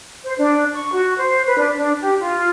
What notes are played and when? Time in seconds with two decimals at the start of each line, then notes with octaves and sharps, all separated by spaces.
0.25 C5
0.39 D4
0.74 C#6
0.93 F#4
1.18 C5
1.46 B4
1.58 D4
1.76 D4
2.00 G4
2.21 F4